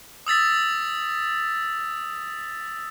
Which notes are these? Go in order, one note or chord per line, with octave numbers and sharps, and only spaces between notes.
D#6 E6 A6 B6